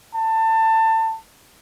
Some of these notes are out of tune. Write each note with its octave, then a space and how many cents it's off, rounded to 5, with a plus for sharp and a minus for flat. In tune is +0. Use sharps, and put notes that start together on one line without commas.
A5 +25